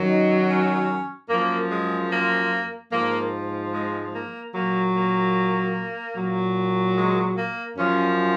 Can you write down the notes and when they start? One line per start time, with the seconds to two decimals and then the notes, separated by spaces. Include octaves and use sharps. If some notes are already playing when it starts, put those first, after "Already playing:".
Already playing: F#2 D#3 F#3
0.08 D#4
0.49 C#4
1.29 F#2 F3 A#3
1.70 G#3
2.10 A#3
2.92 G#2 F3 A#3
3.72 G#3
4.13 A#3
4.53 A#2 F#3 A#3
4.93 A#3
6.15 A#2 F#3
6.96 G#3
7.36 A#3
7.76 F#2 F3 C#4